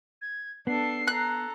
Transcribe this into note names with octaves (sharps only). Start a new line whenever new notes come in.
G#6
B3 D4 A4 C7
A4 A#5 F#6